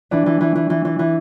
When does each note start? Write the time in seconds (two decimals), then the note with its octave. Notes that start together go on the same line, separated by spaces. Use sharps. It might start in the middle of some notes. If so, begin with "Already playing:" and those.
0.11 E3 D4
0.26 E3
0.41 E3
0.55 E3
0.70 E3
0.85 E3
0.99 E3